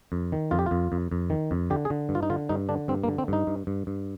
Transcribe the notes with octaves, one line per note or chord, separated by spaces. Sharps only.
F2
D#3
F2 F4
G4
F2 F4
F2
F2
D#3
F2
D3 G4
G#4
D3
G2
F4
D#4
D3 F4
G2 D#4
D3 D4
G2 C4
A#3
D3
C4
G2 D#4
G2
G2
G2